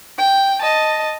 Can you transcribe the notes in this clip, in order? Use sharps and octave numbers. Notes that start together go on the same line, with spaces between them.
G5
D#5 A5